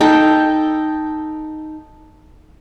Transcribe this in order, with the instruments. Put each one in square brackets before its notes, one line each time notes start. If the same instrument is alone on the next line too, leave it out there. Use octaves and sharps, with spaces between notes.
[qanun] D#4 A4 G5